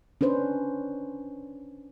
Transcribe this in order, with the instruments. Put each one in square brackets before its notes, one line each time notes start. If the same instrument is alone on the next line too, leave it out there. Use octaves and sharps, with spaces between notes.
[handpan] C#4 D4 B4 C5